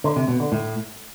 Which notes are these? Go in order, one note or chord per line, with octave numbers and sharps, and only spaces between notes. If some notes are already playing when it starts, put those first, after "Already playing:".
D3
C3
B2
D3
A2